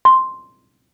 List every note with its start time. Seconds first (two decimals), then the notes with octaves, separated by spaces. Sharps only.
0.05 C6